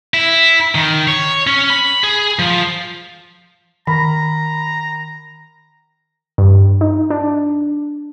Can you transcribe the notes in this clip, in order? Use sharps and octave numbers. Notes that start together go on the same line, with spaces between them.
E4
D#3
C#5
C#4
B5
G#4
F3
D#3 A#5 B5
G2
D#4
D4